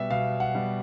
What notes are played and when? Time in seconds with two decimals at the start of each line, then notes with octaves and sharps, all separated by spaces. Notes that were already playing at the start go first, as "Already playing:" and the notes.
Already playing: B2 G3 B3 E5
0.10 B2 F5
0.40 F#5
0.55 G3 B3